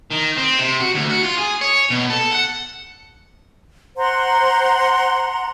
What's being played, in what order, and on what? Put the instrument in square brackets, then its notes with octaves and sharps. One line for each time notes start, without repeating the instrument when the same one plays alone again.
[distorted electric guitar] D#3
C4
C3
F#4
D2
F#4
F4
G#4
C#5
B2
A4
F#5
[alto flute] C5 [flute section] F#5 A#5 C6